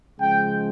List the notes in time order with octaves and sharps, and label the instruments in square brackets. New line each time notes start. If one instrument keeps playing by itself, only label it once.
[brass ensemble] C#3 F3 G#3 G5